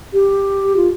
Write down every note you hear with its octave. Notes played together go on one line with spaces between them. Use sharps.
G4
F4